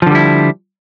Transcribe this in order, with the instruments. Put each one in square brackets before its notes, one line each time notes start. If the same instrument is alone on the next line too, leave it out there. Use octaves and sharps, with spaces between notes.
[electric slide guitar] F3
D3
G3
E4